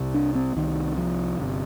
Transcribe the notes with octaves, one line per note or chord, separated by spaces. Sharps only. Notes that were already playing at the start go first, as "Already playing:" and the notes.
Already playing: C2 C3
D4
C4
C2 C3 D#3
F3
G1 C3